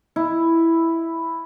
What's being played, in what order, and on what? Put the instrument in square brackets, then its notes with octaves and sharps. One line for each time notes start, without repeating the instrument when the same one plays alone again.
[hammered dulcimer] E4